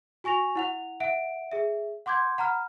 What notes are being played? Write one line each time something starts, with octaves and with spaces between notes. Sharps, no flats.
F#4 G#5 C#6 A#6 F7
E4 F#5 F7
E5 F#5 D7
G#4 E5
F#5 C6 D6 G6 G#6
F#5 A#5 B5 F6